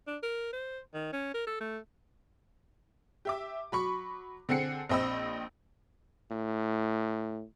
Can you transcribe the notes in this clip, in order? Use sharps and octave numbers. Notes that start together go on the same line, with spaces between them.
D4
A#4
C5
D#3
C#4
A#4
A4
A3
G4 E5 D6
F#3 B5 C#6
D3 C4 G#4 F#5 C7 C#7
A#1 C4 D#5 B5 E6
A2